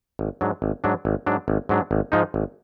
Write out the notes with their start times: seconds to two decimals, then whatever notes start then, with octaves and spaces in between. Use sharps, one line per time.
0.19 G#1
0.41 G#2 F#3 D4
0.62 G#1
0.84 G#2 F#3 D4
1.05 G#1
1.26 G#2 F#3 D4
1.48 G#1
1.69 G#2 F#3 D4
1.91 G#1
2.12 G#2 F3 G#3 D#4
2.34 G#1